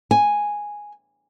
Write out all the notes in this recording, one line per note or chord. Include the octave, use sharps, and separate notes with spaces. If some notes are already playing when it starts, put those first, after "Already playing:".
G#5